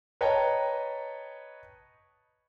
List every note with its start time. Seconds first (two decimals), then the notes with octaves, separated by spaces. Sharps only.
0.21 B4 C#5 D#5 G5 A5 A#5